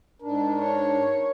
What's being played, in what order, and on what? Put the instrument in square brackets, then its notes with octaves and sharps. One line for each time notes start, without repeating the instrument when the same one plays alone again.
[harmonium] G#2 D4 [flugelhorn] A#4
[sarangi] C#5